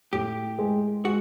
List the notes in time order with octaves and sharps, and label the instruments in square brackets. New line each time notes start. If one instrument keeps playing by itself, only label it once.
[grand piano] A2 [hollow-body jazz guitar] G4
[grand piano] G#3
[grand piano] G#3 [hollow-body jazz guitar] F#4